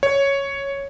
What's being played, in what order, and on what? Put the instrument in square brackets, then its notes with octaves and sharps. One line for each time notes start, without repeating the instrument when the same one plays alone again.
[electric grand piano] C#5